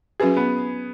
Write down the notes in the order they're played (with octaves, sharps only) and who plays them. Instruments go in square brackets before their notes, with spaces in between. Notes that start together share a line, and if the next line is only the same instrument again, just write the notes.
[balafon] F#3 C#4 F#4 B4 [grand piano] G#4
[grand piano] B3